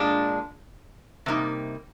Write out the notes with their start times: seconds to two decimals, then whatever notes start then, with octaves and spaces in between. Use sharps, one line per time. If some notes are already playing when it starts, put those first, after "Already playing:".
Already playing: A#2 G#3 D4
1.26 C3 G3 A#3 D#4